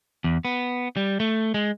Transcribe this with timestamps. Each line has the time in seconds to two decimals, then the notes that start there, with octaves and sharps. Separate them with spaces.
0.24 E2
0.45 B3
0.97 G3
1.20 A3
1.54 G#3